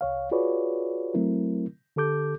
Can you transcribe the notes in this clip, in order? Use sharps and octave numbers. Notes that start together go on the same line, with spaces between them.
C2 C#5 F5
F4 F#4 G#4 B4 C#5 D5
F#3 A3 C4 E4 A#4
D3 G4 A4 D6 G6